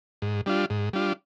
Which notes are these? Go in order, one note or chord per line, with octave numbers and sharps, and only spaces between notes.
G#2
G3 D4 F4
G#2
G3 D4 F4